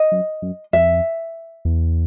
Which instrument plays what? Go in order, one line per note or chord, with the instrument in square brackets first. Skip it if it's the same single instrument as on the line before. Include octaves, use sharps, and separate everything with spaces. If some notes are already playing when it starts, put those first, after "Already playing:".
Already playing: [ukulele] D#5
[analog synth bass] F#2
F#2
[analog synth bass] F2 [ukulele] E5
[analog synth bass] E2